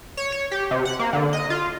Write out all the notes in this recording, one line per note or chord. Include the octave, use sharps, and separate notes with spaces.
C#5
C#5
G4
C3
F#5
A#3
D3
D#5
F4